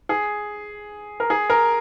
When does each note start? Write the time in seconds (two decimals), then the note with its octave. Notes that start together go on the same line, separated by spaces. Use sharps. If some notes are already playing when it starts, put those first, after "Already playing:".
0.09 G#4
1.20 A#4
1.30 G#4
1.50 A#4